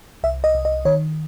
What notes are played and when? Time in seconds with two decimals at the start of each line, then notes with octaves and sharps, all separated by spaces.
0.23 C2 E5
0.44 D#5
0.55 C2
0.65 D#5
0.85 D#3 C#5